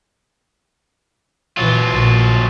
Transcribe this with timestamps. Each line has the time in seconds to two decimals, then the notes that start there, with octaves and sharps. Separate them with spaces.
1.57 A#2 E3 F#3 F4
1.92 A#1